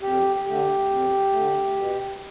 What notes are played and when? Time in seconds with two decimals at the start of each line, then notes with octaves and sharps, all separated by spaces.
0.02 F2 G4
0.45 D3 A3 G4
0.90 F2
1.33 D3 A3
1.76 B2